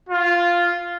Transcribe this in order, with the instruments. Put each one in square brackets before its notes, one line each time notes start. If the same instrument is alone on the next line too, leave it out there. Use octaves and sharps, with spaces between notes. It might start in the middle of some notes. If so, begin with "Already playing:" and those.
[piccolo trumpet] F4